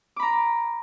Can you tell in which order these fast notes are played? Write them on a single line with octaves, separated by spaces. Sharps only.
D6 B5 A#5